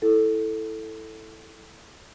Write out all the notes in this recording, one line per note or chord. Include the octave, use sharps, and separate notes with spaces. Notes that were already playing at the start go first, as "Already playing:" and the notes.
E4 A4